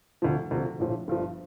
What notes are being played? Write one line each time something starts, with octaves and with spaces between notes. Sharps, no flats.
D2 C3 F3
D2 C3 F3
A#1 A2 F3
G1 G2 F3